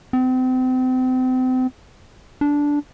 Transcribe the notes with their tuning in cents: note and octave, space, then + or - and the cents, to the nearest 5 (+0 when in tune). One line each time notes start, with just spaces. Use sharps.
C4 -35
D4 -10